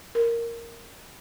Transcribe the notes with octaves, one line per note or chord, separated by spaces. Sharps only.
A#4